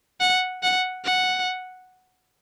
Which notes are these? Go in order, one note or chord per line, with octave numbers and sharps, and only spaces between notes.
F#5
F#5
F#5